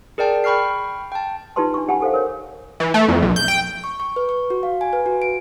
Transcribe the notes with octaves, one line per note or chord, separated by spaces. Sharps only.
G#4 A#4 D5 G5 A5
G5 B5 C#6 F6 C7
G5 A5
D#4 F4 G4 B4 A5 C6
D4 C#6
C#4 G4 F#5 G#5 B5
G4 A4 C5 F5
A#4 C#5
E3
A3
F2
B1
G6
G5
C#6
C#6
B4
C#6
F#4
F5
G#5
B4
F#4
D7